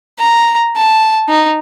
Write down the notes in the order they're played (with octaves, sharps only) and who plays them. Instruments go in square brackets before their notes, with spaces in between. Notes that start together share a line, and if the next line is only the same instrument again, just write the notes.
[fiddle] A#5
A5
D#4